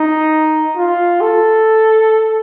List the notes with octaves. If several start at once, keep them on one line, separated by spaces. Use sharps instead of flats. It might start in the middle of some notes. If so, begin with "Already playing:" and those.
Already playing: D#4
F4
A4